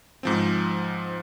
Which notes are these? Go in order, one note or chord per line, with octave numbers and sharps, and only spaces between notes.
G#2 F3 C4